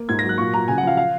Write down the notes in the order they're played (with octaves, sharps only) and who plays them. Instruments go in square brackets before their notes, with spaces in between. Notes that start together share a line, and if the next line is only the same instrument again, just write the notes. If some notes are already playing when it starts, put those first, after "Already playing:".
Already playing: [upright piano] A#3
G#2 G#6
A#6
F#3
F#6
A#2 C#6
F#3 A#5
C#3 G#5
F#5
F3 F5
F5